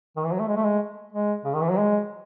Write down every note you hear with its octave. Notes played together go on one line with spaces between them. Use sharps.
D#3
E3
F#3
A3
G#3
A3
G#3
G#3
C#3
D#3
E3
F#3
G#3